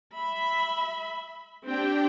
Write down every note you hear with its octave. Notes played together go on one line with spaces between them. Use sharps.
E5 B5
C4 D4 G4 G5